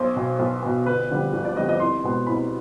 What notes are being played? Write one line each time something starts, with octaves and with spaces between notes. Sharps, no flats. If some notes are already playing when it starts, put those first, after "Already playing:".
Already playing: B1 C5
B2 B3
B1
B2 B3
G1 B4
F2 D3 G3
G1
D5
F2 D3 G3 D#5
D#5
C2 C6
B2 G#3 B3
C2 B5